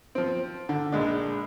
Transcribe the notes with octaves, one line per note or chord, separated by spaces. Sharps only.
F3 C4
D3
A#1 G#3 D4